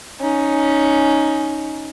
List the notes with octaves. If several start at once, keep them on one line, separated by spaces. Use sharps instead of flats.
C#4 D#4